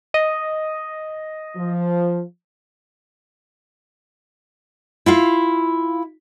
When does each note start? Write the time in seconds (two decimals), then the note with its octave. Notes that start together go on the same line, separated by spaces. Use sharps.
0.14 D#5
1.56 F3
5.06 E4 F4 F5